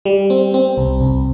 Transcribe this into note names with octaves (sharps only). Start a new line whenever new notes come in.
G3
C4
C4
C2
C2